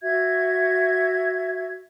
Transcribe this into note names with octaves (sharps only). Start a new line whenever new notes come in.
F#4 E5 G#6